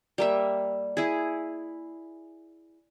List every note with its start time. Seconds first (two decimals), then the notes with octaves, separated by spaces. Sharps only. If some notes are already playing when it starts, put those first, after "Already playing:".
0.18 G3 A#3 E5
0.97 E4 G#4